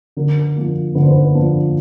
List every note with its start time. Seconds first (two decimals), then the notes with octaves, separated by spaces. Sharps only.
0.17 D3 A#4
0.56 F3 A#3 D4
0.95 D3 B4
1.03 C5
1.11 B4
1.35 F3 A#3 D4